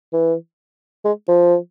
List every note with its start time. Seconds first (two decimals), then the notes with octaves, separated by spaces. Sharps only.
0.13 E3
1.05 G#3
1.28 F3